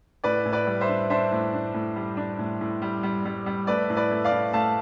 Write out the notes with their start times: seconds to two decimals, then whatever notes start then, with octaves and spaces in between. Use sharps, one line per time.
0.24 A2 B4 D5
0.45 A2
0.53 B4 D5
0.67 G3
0.81 C5 E5
0.89 D4
1.10 D4 C5 E5
1.32 A2
1.53 D4
1.74 A2
1.96 G3
2.17 D4
2.39 A2
2.61 A2
2.82 G3
3.03 G3
3.25 G3
3.46 G3
3.67 A3 B4 D5
3.90 A2
3.96 B4 D5
4.11 A3
4.24 D5 F5
4.32 A2
4.53 A3 F5 A5